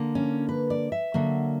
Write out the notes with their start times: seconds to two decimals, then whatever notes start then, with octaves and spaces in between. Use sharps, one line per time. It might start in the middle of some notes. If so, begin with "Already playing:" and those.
Already playing: D3 A#3
0.15 C#4
0.49 B4
0.70 D5
0.92 E5
1.14 D3 F#3 A#3